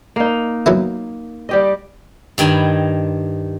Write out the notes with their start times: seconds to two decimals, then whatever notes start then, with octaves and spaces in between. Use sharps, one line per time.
0.16 A#3 D#4
0.66 F#3 B3 E4
1.49 G3 G4 D#5
2.38 G2 D#3 G5 G#5 B5